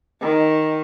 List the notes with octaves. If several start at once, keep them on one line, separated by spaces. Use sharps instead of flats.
D#3